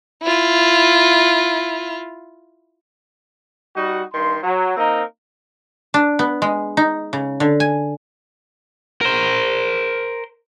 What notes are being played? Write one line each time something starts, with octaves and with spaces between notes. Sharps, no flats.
E4 F4
G3 D#4 F#4
G2 D#3 C6
F#3
A#3 C4 D#4 A#4
D4
B3
G#3
D#4
C#3
D3
G#5
A#4 C5